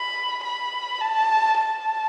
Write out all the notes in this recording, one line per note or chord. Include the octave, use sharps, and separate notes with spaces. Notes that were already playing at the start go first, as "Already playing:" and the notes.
Already playing: B5
B5
A5
A5